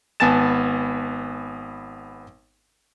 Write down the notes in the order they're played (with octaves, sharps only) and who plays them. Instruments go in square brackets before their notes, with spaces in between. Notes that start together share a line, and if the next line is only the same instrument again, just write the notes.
[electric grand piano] G#1 B3 G#5 A5 A6 E7